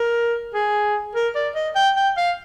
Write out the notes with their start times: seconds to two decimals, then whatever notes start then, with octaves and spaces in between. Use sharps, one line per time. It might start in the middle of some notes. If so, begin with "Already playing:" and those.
Already playing: A#4
0.54 G#4
1.15 A#4
1.35 D5
1.55 D#5
1.75 G5
1.96 G5
2.17 F5